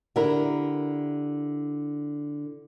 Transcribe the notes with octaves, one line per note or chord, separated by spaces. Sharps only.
D3 E4 G4 A#4